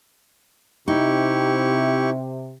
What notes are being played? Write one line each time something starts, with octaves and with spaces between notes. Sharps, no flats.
C3 D#4 E4 G4 C#6